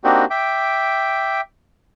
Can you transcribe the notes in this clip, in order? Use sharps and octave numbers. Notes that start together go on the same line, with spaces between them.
A#3 C4 D4 D#4 F#4 G4
E5 G5 D6